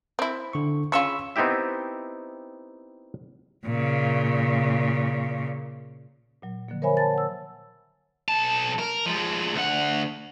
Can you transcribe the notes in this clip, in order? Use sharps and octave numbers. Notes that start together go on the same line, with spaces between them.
C4 E4
D3 C#6
C#3 C#4 F4 B5 C#6 E6
B3 C4 D#4 E4 G4 E5
A#2 C#3
A#2 F#3
D3 F3 F#3 A#3
A#4 C5 C#5 E5 G#5 B5
C5 A5 A6
F#5 E6
B1 A5
A#4
F3 G#3
D2 F#5